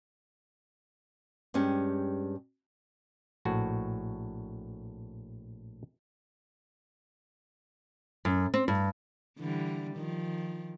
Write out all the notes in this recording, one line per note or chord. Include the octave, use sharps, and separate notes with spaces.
G2 G#3 C#4 G4
A#1 A2 F#4
F#2
C4
G2
D3 E3 G3
D#3 F3